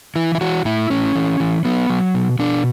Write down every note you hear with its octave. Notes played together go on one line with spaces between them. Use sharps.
E3 E4
E4
E3 F#4
A2 E4
A2 C#4
E3
E3
F#3 B3
F#3
B2
B2 D4